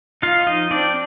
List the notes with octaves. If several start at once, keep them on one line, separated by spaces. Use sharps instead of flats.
D#4 F4 F5
F3 D#4 D#5
C4 D4 D5